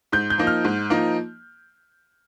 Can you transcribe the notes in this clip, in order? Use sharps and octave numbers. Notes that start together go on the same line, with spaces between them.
G#2 G6
G6
F3 A#3 D#4
F6
G#2
F3 A#3 D#4